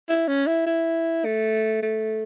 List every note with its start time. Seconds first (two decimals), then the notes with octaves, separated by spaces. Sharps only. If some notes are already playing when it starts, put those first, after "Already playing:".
0.09 E4
0.28 C#4
0.47 E4
0.66 E4
1.25 A3
1.83 A3